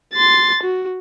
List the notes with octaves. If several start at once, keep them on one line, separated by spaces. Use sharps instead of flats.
C6 A6
F#4